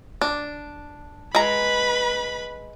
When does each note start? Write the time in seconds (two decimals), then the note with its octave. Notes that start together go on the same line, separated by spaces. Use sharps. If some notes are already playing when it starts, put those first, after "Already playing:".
0.21 D4
1.35 G#3 B4 A#5 B5